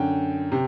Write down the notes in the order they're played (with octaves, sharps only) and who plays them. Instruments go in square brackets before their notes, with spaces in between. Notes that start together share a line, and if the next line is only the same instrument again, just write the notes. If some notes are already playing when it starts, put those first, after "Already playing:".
Already playing: [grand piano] F#2 D3 G5
C3